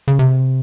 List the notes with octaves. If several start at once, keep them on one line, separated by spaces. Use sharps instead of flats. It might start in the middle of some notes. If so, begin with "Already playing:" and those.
C#3
C3